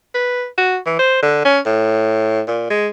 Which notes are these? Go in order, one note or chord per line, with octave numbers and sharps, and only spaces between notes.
B4
F#4
E3
C5
D3
C#4
A2
A#2
G#3